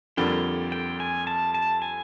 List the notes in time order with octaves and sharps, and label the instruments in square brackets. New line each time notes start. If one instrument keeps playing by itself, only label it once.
[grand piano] F2 D3 G3 A#3 [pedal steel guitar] G5
[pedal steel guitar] G5
G#5
A5
A5
G#5